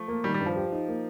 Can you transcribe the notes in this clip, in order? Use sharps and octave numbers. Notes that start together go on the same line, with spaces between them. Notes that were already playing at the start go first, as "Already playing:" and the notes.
Already playing: F3 A3
A#3
D#3 G3
G3
G2
F3
G4
D#4
A#3